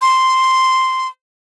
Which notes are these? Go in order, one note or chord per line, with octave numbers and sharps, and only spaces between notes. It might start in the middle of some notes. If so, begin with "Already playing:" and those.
C6